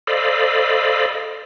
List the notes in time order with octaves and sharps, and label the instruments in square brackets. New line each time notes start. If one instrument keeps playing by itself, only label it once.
[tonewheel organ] A4 C5 D5 D#5 F5 B5